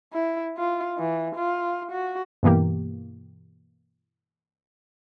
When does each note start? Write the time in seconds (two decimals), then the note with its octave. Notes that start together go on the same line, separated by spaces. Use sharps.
0.13 E4
0.57 F4
0.98 E3
1.36 F4
1.91 F#4
2.43 G2 B2 E3 A#3 G4